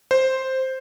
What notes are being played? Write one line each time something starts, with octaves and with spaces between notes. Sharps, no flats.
C5